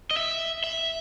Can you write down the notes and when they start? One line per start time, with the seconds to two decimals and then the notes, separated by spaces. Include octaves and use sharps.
0.11 D#5
0.17 E5
0.64 E5